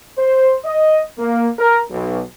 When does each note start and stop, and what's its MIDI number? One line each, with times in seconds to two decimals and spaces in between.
0.17 0.55 72
0.64 0.99 75
1.18 1.47 58
1.58 1.79 70
1.91 2.20 35